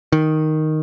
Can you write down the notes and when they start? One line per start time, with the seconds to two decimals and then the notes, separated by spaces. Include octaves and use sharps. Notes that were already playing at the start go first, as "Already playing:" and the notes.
0.12 D#3